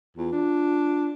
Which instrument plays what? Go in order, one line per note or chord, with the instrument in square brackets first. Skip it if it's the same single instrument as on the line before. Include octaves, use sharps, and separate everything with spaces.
[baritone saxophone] E2 [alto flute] F4
[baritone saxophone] D4